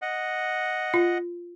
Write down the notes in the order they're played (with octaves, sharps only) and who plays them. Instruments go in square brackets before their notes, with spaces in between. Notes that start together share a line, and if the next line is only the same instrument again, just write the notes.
[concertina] D#5 F#5
[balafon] F4